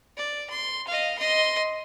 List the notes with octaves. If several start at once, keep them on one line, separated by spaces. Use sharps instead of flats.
D5
C6
D#5 F5
D#5 C6